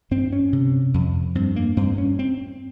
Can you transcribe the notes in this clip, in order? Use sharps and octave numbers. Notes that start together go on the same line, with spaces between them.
G2 C4
C#4
C3
F2
G2 C4
A#3
G2 C4
C#4
C4